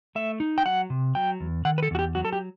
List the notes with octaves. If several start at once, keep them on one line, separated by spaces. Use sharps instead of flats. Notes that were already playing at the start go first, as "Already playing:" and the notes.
A3 E5
D#4
G5
F#3 F#5
C3
F#3 G5
E2
D#3 F#5
B4
A4
E2 F#4
G4
F#3 F#4
A4
G4